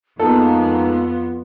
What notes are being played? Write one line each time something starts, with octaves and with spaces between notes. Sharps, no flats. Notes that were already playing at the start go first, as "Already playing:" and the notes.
F2 G#3 A#3 B3 D#4 F4 A4